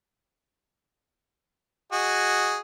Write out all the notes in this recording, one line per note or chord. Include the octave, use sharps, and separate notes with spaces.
F#4 G#4 D#5